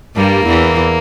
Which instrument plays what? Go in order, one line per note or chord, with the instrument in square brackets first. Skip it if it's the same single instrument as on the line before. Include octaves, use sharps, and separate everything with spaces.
[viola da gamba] G2 G3 [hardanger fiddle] A#3
[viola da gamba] E2 E3